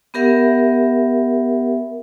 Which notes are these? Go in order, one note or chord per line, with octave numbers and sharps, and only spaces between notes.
B3 G4 A#4 E5 F#5